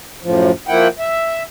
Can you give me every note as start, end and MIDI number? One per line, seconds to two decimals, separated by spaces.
0.23 0.51 42
0.23 0.51 45
0.23 0.51 53
0.68 0.88 53
0.68 0.88 58
0.68 0.88 64
0.68 0.88 78
0.68 0.88 79
0.99 1.43 76